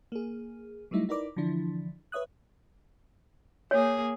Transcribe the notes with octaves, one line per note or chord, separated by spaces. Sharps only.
A#3 G#4
F#3 G3 A3 D#4 E4
D#4 E4 A#4 B4 D5 D6
D3 E3 F3 D4 E4
B4 C#5 E5 D#6 F#6
A#3 G#4 C#5